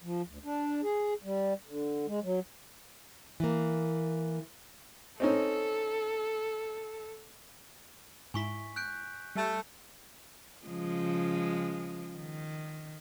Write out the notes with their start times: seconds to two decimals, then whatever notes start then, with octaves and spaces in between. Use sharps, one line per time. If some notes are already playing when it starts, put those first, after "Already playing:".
0.02 F3
0.28 D2
0.44 D4
0.83 G#4
1.23 G3
1.66 D3
2.07 G#3
2.23 F#3
3.40 E3 A#3
5.20 C4 C#4 D#4 A4
8.34 G#2 E4 G#5 C#6 B6
8.76 F#6 G6 D7
9.35 G3 A3
10.66 C#3 F3 G#3
12.17 D#3